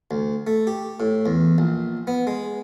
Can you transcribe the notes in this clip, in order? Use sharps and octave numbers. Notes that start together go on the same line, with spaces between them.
D2
A3
G4
A2
E2
A#1
B3
G#3